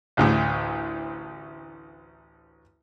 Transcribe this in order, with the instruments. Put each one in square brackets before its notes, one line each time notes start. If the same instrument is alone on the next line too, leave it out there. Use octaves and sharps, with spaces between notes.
[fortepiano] A1 D2 A2